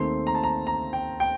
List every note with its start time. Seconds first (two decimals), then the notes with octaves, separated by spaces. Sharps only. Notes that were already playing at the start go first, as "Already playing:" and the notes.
Already playing: D#2 D#3 A3 C4 C6
0.27 A#5
0.35 A5
0.43 A#5
0.67 A#5
0.93 G5
1.20 G5